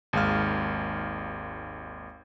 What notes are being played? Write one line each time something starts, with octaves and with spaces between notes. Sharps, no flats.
G#1 D#2 G#3 F5 F6